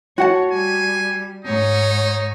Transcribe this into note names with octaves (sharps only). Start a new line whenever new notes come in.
F#4 C#5 F#5 A5
G3 G#5
G#2 D#4 C#5